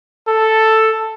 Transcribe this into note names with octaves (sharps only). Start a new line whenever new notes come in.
A4